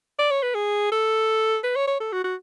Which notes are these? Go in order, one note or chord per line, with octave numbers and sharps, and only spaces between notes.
D5
C#5
B4
G#4
A4
B4
C#5
C#5
A4
F#4
F#4